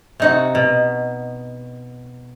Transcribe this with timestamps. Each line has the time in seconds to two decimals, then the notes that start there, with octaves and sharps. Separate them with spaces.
0.20 C3 D#4 F#4
0.55 B2